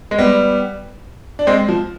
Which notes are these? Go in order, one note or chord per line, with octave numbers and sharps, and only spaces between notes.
G#3
G3 B3
D4
G#3 C4
F3